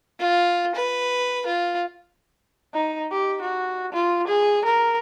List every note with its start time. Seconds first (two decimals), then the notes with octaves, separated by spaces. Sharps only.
0.19 F4
0.75 B4
1.46 F4
2.74 D#4
3.12 G4
3.42 F#4
3.92 F4
4.27 G#4
4.65 A#4